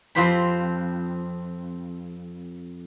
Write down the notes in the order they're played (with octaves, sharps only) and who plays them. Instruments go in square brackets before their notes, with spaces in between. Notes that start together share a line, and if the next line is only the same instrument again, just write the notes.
[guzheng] F2 C4 F4 G4 C5 B5